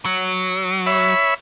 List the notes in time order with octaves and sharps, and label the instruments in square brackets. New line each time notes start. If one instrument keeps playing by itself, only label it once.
[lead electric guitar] F#3
[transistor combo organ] C#5 E5 B5